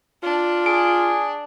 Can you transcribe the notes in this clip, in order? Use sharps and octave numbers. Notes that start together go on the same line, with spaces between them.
D4 F4
G#4 D7